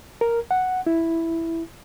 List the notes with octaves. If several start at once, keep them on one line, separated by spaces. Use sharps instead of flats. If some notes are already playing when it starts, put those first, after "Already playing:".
A#4
F#5
E4